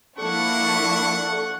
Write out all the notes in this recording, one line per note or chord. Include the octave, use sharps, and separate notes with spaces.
F3 A#3 D4 E4 A4 F#5 C#6